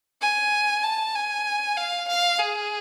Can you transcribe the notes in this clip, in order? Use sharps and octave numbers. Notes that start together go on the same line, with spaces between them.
G#5
A5
G#5
F5
F5
G#4